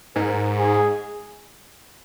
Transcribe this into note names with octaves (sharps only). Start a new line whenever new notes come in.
G#2 A#4
G#4